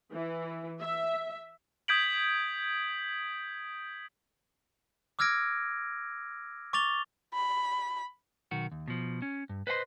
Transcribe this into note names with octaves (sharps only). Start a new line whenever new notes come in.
E3
E5
D#6 G6 G#6 B6 D7 F#7
D6 E6 F6 G#6 A#6 D7
C#6 D6 A6 F7 G7
B5
B1 D#3 F#4
D#2
B2 F3
C#4
G2
B4 C5 D#5 F5 C6